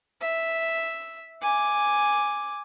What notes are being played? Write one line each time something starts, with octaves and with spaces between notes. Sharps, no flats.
E5
G#5 D6